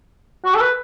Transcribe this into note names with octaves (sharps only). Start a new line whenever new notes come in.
F#4
A4
B4